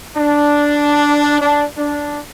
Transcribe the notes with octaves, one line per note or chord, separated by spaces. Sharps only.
D4
D4
D4